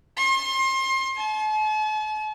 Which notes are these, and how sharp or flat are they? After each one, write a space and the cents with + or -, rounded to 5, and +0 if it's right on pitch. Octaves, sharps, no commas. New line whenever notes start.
C6 +30
A5 -45